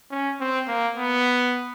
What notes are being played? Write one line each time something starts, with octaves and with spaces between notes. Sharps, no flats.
C#4
C4
A#3
B3